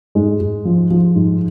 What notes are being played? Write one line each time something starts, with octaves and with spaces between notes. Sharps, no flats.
G#2 G#3
G#2
F3
F3
G#2